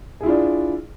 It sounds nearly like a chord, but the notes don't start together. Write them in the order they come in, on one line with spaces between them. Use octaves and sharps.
G#4 E4 F4 D4